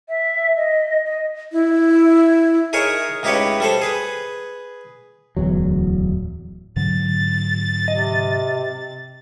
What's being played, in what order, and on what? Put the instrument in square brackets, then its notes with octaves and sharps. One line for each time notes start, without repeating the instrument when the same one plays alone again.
[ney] E5
D#5
D#5
[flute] E4
[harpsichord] D#4 G#4 A#4 C#5 E5
C#2 D#4 E4 G4 B4 C#5
G3 A4 C5
G#4 B4
[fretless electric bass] D1 E2 F#3
[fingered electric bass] G#2 D3 F#3 [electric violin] A6
[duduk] C3 [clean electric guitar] D#5